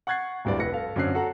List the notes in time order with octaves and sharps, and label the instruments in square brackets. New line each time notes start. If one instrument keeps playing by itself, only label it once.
[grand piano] F#5 C#6 F#6 G#6 A6 C7
D1 G2 D5
F1 B4 A#6 C#7
A4 F5
F#2 D3 C4 C#4 F#6 C7
F#4 A4 F#5 A#5